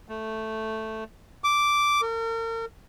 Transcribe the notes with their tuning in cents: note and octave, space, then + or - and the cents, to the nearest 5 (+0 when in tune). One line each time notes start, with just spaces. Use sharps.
A3 +0
D6 -5
A#4 -40